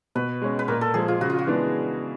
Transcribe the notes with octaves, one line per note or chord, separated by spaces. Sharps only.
B2 B4
G#3 C#4
B4
A#2 A#4
A4
F3 G#3 G#4
F4
C#3 F#4
F4
F#4
E3 G#3 B3 D4